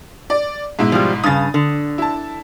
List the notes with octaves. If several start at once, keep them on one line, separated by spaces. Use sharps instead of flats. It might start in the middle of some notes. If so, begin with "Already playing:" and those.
D5
G#2 B2 E4
F3 G3
G2 C#3 D#6 A6
D3
E4 A5